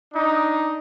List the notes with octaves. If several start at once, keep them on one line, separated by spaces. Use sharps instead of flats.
D4 D#4